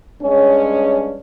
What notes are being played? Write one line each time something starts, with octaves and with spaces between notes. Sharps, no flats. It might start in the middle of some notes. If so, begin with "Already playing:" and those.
G2 G#3 C#4